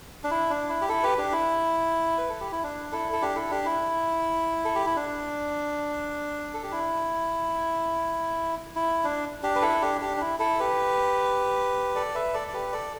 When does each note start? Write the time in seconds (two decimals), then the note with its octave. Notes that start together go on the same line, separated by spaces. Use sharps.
0.24 D4
0.31 E4
0.50 D4
0.69 E4
0.81 G4
0.89 E4 A4
1.03 G4 B4
1.18 D4 G4
1.33 E4
2.18 B4
2.29 A4
2.40 G4
2.52 E4
2.64 D4
2.92 E4 A4
3.12 A4
3.22 D4 G4
3.36 E4 A4
3.51 D4 G4
3.66 E4
4.65 A4
4.75 G4
4.86 E4
4.96 D4
6.54 A4
6.63 G4
6.72 E4
8.75 E4
9.04 D4
9.43 D4 G4
9.56 B4
9.62 E4 A4
9.82 D4 G4
10.01 D4 G4
10.17 D4
10.21 E4
10.40 E4 A4
10.59 G4 B4
11.95 A4 D5
12.15 B4 E5
12.34 A4 D5
12.48 D5
12.53 G4 B4
12.72 A4 D5